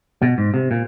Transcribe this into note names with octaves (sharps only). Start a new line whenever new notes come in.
B2
G#2
C3
A#2